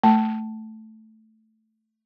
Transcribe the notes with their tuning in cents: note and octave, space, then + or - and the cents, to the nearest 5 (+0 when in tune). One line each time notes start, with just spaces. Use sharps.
A3 +0 A5 +0